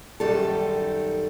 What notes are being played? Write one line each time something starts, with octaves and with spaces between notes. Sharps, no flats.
F#2 D#3 G3 A4